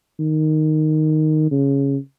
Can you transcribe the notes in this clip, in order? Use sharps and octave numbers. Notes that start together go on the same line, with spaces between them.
D#3
C#3